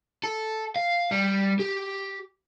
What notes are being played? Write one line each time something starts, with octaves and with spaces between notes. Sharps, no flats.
A4
F5
G3
G4